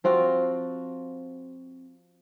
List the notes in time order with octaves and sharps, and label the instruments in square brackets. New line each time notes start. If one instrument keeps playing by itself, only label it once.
[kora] F3 C4 F4 F#4